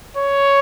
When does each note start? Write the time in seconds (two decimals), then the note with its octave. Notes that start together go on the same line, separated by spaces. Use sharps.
0.17 C#5